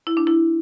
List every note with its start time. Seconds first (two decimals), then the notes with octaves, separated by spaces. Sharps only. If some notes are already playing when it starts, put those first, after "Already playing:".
0.07 E4
0.17 D4
0.27 E4